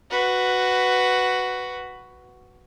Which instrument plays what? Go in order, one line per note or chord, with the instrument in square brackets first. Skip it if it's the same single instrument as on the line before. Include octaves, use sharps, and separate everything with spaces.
[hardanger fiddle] F#4 B4